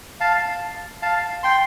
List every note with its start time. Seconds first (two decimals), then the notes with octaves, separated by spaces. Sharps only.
0.20 F5 A5
1.02 F5 A5
1.43 G5 C6